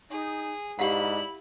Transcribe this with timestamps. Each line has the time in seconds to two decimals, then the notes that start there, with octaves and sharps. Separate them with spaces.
0.10 D#4 G#4
0.79 G#2 E4 G4 D5 F5 F#5 B5